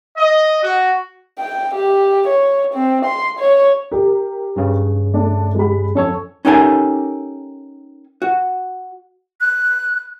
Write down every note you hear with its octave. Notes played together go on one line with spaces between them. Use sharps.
D#5
F#4
G5
G4
C#5
C4
C6
C#5
G4 A#4
G2 C#3
A3 D4
G#3 G4 B5
F2 C#4 A4 C#5
C#4 D#4 G4 A4 A#4 G#5
F#4
F#6